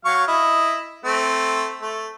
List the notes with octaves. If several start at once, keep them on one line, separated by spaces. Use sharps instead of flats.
F#3 F5 C#6
E4 D#5
A3 C4
A3